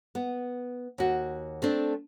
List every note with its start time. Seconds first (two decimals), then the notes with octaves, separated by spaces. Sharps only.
0.15 B3
0.98 D#2 F#4
1.62 A3 C4 D4